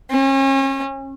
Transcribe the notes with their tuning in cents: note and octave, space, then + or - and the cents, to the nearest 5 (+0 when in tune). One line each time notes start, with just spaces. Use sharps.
C#4 -35